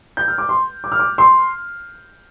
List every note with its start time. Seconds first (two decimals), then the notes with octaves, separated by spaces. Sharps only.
0.17 G6
0.28 F6
0.38 D6
0.49 C6
0.84 D6
0.92 F6
0.99 D6
1.18 C6